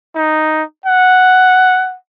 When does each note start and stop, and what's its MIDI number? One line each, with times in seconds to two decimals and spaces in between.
0.15 0.63 63
0.86 1.96 78